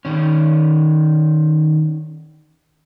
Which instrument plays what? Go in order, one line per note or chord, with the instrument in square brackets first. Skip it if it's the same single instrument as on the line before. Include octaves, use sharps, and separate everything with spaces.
[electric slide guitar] D#3 C#4